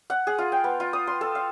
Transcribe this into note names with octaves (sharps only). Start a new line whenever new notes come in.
F#5
G#4
F4
G5
B3
F4
D#6
C6
A4
F5